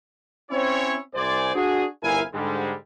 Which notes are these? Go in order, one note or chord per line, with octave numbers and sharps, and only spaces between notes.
C4 C#4 E4 C#5
C2 C5 D5 G#5
D4 F#4 G#4
G1 C2 E4 A#4 F5 G#5
G#2 D3 G3 G#3